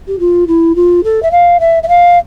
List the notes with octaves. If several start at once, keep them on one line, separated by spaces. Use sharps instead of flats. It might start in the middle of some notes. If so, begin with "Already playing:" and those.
G4
F4
E4
F4
A4
E5
F5
E5
E5
F5